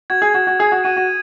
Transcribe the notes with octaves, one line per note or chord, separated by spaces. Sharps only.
F#4 G#6
G#4
F#4 G#6
F#4
G#4 D#6
F#4
F#4 D#7
F#4